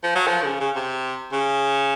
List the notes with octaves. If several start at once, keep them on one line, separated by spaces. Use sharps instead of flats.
F3
F#3
F3
D3
C#3
C#3
C3
C#3